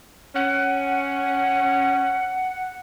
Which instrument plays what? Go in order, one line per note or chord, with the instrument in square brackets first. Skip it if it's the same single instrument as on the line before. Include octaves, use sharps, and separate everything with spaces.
[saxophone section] C#4 [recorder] F#5